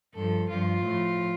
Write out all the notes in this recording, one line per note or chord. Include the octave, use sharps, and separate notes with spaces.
G2 F3 A4
G2 F3 F4
A2 F3